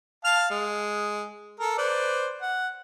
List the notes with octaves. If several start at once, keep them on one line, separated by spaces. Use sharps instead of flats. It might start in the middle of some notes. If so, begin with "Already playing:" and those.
F5 A5 F6
G#3
A4 A#4
B4 C5 D5
F#5